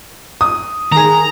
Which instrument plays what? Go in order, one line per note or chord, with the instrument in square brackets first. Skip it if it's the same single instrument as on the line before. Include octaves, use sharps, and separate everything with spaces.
[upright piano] D#6
[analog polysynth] D#3 G#4 [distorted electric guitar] A#5